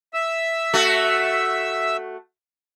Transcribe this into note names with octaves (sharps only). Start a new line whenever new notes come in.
E5 E6
A3 F#4